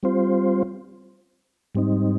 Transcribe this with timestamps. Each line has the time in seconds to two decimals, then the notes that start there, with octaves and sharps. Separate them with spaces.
0.03 G3 C4 F4 C5
1.75 G#2 G3 C4 D#4